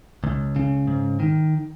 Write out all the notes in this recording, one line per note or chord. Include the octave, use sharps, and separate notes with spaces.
C#2
C#3
G#2
D#3